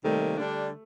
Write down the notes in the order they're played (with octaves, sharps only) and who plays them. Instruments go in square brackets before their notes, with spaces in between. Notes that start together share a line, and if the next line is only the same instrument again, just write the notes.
[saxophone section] C3 D#3 G3 A#3 [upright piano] A3
[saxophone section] D3 G3 D4